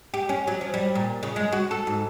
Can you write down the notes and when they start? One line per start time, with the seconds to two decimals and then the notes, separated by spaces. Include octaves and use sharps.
0.14 G4
0.29 C#4
0.47 F#3
0.61 F3
0.74 G3
0.95 A#2
1.23 C#3
1.36 G#3
1.52 F#4
1.71 A4
1.87 G#2